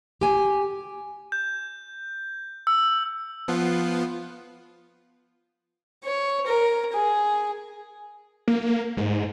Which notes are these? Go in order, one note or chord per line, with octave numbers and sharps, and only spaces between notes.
G4 G#5
G6
E6
F3 B3 F4
C#5
A#4
G#4
A#3
G#2